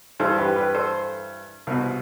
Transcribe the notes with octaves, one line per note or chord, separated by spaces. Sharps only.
G2 E3 A4 C5
G4 B4
G4 B4
A4 C5
C2 B2